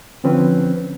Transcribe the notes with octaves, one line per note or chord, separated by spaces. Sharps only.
D3 F3 C4 C#4 B4